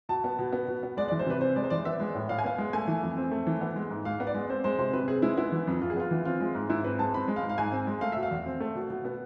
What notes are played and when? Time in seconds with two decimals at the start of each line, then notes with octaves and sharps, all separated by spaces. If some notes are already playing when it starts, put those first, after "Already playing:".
0.09 B2 A5
0.24 B3
0.39 B2
0.53 B3
0.68 B2
0.83 B3
0.97 G#3 D5
1.08 D5
1.11 E3
1.19 C5
1.26 C3 B4
1.41 C4 C5
1.56 G#3 D5
1.64 C5
1.70 E3 D5
1.85 B3 E5
2.00 G#3
2.14 A2
2.29 A2 F5
2.39 G#5
2.44 B3 F5
2.58 G#3
2.73 A3 G#5
2.88 E3
3.03 F2
3.17 C4
3.31 A3
3.47 E3
3.61 B3
3.76 G#3
3.91 G#2
4.05 G#2 F5
4.20 B3
4.27 D5
4.34 G#3
4.49 C4 C5
4.64 G#3 C5
4.78 C3 C5
4.93 C3 B4
5.08 C4 G#4
5.22 G#3 E4
5.37 B3 E4
5.52 E3
5.67 F2
5.82 F2 F4
5.90 G#4
5.96 B3 F4
6.11 E3
6.25 C4 F4
6.40 G#3
6.55 G#2
6.70 G#2 E4
6.84 C4 B4
6.99 G#3 A5
7.14 C4 B5
7.28 G#3
7.36 F5
7.43 G#2
7.49 F5
7.58 G#2 G#5
7.72 C4
7.87 G#3
8.01 A3 F5
8.12 B2 E5
8.23 F5
8.31 E2
8.46 C4
8.60 A3
8.75 B2
8.90 B2
9.05 B3